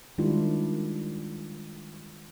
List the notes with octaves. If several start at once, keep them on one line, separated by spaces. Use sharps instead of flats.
D#3 G3 G#3 D4 E4 F4